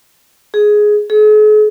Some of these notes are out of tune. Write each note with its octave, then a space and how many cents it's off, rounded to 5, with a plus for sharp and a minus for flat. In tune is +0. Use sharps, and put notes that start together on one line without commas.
G#4 +10
G#4 +45